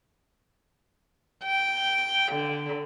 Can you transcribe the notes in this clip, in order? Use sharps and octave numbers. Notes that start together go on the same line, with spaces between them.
G5
D3